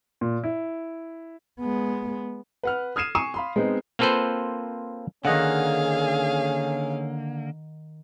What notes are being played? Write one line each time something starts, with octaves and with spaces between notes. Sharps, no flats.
A#2
E4
G#3 B3
B4 F#5 F6
D#6 F6 G#6 C7 D#7 E7
G#5 C#6 D#6 C7 D#7 E7
F5 B5 C6
G#3 B3 C4 D#4
A#3 C4 F4 A4 B4 C5
D3 D#3 A#3 C#4 G#4 D#5 F5 F#5